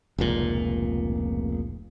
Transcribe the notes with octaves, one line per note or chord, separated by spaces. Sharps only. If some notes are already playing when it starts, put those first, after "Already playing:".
F1 C#2 A#2